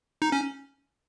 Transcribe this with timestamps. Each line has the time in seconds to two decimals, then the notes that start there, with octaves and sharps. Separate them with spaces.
0.22 D#4
0.32 C#4